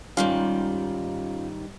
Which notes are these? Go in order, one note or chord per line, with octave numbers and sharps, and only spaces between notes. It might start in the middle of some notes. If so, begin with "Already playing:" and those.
G#2 D#3 G3 C#4 F4 F5